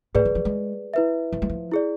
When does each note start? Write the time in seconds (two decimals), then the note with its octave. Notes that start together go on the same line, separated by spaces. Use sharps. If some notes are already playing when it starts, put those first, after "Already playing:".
0.15 A2 G#4 B4 D5
0.25 E3
0.35 F3
0.45 G#3
0.94 E4 B4 E5
1.33 F3
1.42 G#3
1.50 F3
1.71 E4 G#4 D5